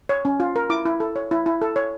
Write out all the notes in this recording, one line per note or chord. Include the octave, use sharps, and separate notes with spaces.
C#5
C#4
F4
A#4
E4 D6
E4
A4
C#5
E4
E4
A4
C#5